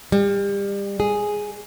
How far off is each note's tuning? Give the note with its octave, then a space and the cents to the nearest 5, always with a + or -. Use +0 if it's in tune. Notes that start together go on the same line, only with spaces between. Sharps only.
G3 +30
G#4 +0